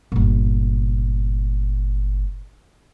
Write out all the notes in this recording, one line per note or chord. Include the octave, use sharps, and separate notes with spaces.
G1 A#2